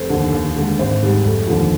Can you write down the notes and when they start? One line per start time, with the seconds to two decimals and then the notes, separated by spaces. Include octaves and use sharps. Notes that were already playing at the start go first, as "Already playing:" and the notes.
Already playing: F1 C5
0.10 D#2 D3
0.32 D#2
0.56 D3 G#3
0.79 G#1 C5
1.02 G#2 G3
1.25 F1
1.48 D#2 D3 F3